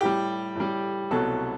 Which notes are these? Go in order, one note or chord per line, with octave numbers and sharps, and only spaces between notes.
A2 G3 G4
A2 G3
C2 B2 F#3 A4